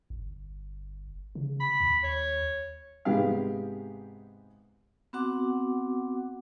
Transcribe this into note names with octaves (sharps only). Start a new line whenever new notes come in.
G1
C#3
B5
D#2
C#5
G#2 C3 G#3 B3 G4 F5
B3 C4 F#4 F#5 D6